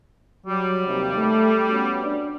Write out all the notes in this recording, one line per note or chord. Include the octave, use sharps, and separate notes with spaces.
F#3 G3
D#2 C3
A3
B3 C#4 F#4
D4